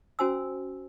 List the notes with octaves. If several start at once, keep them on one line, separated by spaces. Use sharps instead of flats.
C#4 F#4 C5 G#5 E6